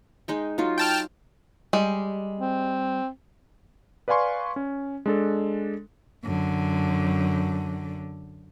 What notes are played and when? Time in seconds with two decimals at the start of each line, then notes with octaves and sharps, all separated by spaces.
0.28 G#3 D#4 G5
0.58 F#3 D#4 F4
0.78 G5 A5 F6
1.73 G3 G#3
2.40 C4
4.08 B4 D5 F5 G#5 C6 C#6
4.56 C#4
5.06 G#3 D4 A4
6.25 F#2 D3